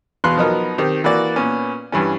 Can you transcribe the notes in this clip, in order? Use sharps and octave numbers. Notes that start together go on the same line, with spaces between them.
E2 B2 B4 F5 C6 F#6
F3 F#3 B3 D#4 A#4
D#3 C4 G4
E3 A#3 F#4 D5
A#2 B3 C#4
G2 E3 C#4